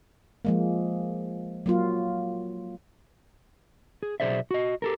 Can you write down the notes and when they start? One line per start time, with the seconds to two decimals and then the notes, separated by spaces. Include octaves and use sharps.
0.45 F3 G#3 A#3
1.66 F#3 A#3 F4
4.03 G#4
4.20 B1 G2 G#4 C5 D5 E5
4.51 F#4 D#5
4.82 G4 A4 A#4